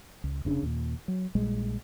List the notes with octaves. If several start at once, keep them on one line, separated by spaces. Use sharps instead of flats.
C#2
F1 C#3 D4
D#2 A#2
F#3
A#1 A#2 G3 G#3